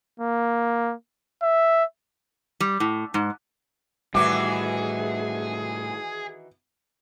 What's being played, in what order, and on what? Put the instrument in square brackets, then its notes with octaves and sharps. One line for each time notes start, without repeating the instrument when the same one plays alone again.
[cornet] A#3
E5
[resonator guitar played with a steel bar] G3
A2
G#2
[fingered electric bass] A2 G3 [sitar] D#3 E3 F#4 [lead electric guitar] G#4 [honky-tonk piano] D6